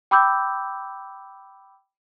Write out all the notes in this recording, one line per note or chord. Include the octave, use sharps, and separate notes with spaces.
G5 B5 D6 E6 G6